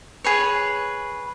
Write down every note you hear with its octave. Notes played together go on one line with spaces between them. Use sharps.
G#4 B4 C#5